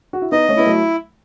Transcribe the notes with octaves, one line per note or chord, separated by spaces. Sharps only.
F#4
E4
B3 D#4 D#5
A3 C#4
B3 E4
F#3 A3